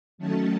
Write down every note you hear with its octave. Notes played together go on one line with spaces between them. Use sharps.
D#3 F#3 A3 C#4 A5